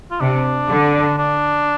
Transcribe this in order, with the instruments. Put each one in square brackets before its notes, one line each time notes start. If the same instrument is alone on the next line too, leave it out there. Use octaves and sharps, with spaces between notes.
[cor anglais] F4
[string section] C3 [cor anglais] D4
[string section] D3
[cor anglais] D4